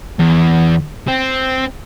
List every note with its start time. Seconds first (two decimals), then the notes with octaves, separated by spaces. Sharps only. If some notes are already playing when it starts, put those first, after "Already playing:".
0.20 E2
1.08 C4